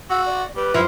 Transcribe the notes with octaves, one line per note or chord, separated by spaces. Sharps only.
F#4 E6
D5
G3 B4
F#2 F3 E4